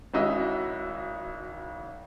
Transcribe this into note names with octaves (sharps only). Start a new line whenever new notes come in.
G#1 C#4 E4 F#4 D#5 E5